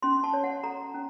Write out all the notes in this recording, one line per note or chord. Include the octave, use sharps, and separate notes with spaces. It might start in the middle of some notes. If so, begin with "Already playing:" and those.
C#4 C6
A5
C#5
F#5
A4 A#5
C#4